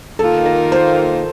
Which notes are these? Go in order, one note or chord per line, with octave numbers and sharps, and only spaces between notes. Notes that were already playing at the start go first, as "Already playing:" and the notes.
D#3 A#3 F4 A4
A#4
C5